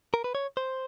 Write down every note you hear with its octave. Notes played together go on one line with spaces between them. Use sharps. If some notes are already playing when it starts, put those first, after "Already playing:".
A#4
B4
C#5
C5